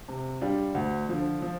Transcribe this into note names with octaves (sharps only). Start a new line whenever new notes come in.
C3
G3 D4 F4
D2
D3 F3
F3